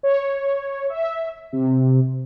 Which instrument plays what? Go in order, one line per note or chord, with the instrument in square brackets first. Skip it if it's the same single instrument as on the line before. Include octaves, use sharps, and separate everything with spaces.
[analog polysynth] C#5
E5
C3